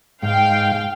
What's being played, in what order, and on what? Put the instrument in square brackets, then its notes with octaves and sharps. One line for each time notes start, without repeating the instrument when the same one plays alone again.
[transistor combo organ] G#2 [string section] F5 G5